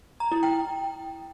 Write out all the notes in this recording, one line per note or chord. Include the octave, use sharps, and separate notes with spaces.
A#5
E4
G5